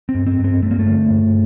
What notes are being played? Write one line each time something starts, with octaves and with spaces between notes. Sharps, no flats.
C4
G2
C4
G2
C4
G2 A3
A#3
A3
D3
G2